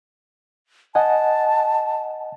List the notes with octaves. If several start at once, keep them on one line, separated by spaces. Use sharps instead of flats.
D#5 F#5 G#5 A5